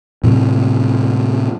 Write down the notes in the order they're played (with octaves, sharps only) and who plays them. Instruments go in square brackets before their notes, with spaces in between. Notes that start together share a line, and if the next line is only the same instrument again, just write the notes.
[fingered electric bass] A2 C3 F#3